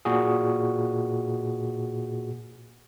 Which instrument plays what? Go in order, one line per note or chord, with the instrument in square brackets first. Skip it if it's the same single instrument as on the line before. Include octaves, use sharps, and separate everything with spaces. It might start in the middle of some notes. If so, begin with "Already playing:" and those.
[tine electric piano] A#2 F#4 G#4